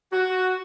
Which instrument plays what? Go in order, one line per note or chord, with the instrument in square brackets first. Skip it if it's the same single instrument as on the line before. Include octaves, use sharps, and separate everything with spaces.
[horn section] F#4